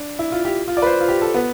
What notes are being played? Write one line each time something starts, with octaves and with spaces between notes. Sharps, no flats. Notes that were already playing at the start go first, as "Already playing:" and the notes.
Already playing: D4
E4
F4
G4
F4
D5
B4
C5
F4
G4
A4
B3